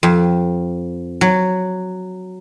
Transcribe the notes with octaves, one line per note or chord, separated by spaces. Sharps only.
F2
F#3